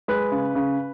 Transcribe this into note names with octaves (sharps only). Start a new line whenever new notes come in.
G#3 B4
C#3
C#3